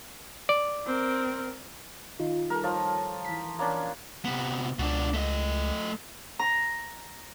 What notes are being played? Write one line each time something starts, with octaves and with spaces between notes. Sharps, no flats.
D5
C4 A#4
D#3 D#4 F4
G3 A4 A#4
F3 F4 C#5
E3 B6
A#3 C#4 D4
C3 B3
C#2 B2 D4
A3 D#5
A#5